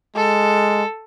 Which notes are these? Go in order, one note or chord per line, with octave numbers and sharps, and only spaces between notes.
G#3 A4